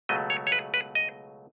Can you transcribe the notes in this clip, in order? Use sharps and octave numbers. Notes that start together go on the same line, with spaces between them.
C#2 B2 F#3 A3 D#5
C#5
C#5
B4
B4
D#5